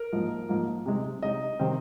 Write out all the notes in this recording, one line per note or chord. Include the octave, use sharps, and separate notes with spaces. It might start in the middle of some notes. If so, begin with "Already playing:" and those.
Already playing: A#4
G#2 F3 A#3 D#4
G#2 F3 A#3 D#4
C3 G#3 D#4
C3 G#3 D#4 D#5
C3 D#3 C4